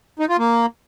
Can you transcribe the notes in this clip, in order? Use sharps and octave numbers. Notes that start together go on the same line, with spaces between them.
D#4
F4
A#3